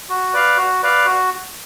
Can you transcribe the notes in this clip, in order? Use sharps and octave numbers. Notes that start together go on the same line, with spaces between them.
F#4
B4 D5 F5
F#4
B4 D5 F5
F#4